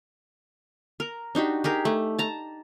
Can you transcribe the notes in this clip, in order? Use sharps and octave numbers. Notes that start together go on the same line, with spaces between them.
A#4
D4 D#4 F#4 G4
G4 G#4 A#4
A3
A5 A#5